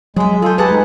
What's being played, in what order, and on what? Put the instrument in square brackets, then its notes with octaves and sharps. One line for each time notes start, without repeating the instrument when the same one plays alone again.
[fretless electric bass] F#3 [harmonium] G#3 [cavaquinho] G#4 E5
[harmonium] F4 A4 [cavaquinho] G#4 C5
[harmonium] G4 [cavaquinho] G#4 F#5 A5 [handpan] B4
[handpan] G#3 [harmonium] D#4